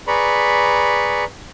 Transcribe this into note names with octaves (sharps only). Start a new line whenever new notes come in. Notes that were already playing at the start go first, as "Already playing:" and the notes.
G#4 B4 D5 A#5 B5 C#6